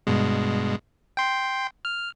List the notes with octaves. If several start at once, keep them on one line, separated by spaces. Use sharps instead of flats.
G2 B2 G#3
G5 C6
F6